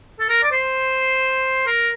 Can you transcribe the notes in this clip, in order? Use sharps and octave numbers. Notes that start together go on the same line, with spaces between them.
A4
A#4
D5
C5
A#4